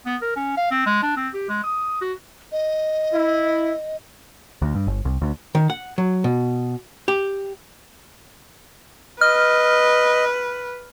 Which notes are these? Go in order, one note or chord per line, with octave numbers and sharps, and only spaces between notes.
B3
A#4
C#4
F5
C4
G#3
D4
C4
G4
G#3
D#6
F#4
D#5
E4
D2
G2
G1
C2
D2
D#3
F#5
F#3
B2
G4
B4 D#5 F6